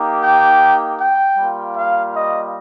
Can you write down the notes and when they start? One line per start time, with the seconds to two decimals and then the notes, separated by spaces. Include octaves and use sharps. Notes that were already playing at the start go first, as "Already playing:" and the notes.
Already playing: A#3 D#4 G4
0.24 G5
1.00 G5
1.38 G3 A#3 F4
1.76 F5
2.15 D#5